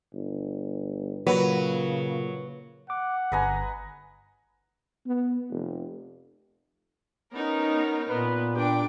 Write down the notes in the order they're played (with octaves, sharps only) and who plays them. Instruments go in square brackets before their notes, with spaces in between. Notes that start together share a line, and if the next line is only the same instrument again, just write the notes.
[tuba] G1
[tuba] A#2 [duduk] C#3 [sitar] F#3 [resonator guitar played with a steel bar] B4
[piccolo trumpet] F#5 [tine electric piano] D6
[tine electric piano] G1 A#5 [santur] B4 D#5 G#5
[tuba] B3
F1
[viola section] B3 D#4 [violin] C#4 A#4
[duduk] A#2 [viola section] B3 [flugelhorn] B4
[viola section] D4 [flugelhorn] G4 [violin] G5 D6